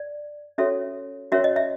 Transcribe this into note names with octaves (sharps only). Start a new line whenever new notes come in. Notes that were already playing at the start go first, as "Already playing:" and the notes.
Already playing: D5
C#4 F#4 A4 C#5 E5
C#4 F#4 A#4 C#5 E5
D#5
E5